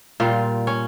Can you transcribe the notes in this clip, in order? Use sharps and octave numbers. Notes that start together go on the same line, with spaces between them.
A#2 G3 F4
C#4